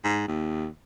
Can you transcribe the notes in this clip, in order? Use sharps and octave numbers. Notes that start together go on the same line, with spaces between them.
G#2
D#2